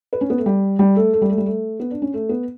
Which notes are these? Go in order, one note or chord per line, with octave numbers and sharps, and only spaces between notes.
B4
C#4
B3
A3
G3
G3
A3
A3
G3
A3
G3
A3
B3
D4
C#4
A3
B3